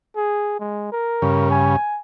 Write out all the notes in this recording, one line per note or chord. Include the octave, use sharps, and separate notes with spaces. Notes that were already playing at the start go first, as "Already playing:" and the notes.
G#4
G#3
A#4
G2 C#3
G#5